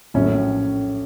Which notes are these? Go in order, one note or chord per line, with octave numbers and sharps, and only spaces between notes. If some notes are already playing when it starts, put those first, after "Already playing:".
A#1 A2 F#3 C#4